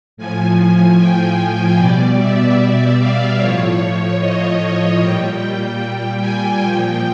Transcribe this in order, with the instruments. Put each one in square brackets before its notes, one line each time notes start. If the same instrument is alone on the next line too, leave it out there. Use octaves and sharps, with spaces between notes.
[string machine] A2 F3 G#5
G5
B2 G3 D5
E5
F5
A2 F3 C#5
D#5
A#2 G3 G5
G#5
A#2 F3 G5